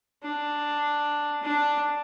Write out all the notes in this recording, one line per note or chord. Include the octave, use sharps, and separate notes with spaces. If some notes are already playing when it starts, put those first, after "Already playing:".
D4
D4